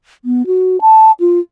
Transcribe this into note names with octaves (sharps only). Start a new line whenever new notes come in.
B3
F#4
A5
F4